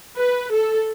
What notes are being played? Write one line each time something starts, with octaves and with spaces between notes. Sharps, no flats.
B4
A4